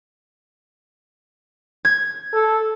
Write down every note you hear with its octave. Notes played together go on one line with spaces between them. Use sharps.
G#6
A4